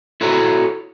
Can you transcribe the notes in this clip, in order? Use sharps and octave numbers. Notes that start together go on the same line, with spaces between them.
E4 F#4 A4 C#5 A#5